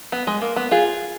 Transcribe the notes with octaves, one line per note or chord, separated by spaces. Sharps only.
B3
G#3
A#3
B3
F4 G#4